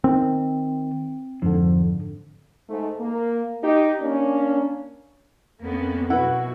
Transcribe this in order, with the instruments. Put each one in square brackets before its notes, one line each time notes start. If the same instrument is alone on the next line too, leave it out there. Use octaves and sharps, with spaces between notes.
[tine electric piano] D#3 [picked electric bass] C4
[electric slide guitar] F2 [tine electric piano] G#2 D3
[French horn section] G#2 A3
A#3
D#4 G4
A#3 C#4 D4
[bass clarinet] F2 [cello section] A#3 B3 C#4
[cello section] F#2 B2 F#4 [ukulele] E4 B4 [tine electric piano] F#5